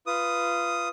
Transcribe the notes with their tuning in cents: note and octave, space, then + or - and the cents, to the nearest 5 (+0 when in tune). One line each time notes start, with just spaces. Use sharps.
F4 -20 B4 +0 D#6 +0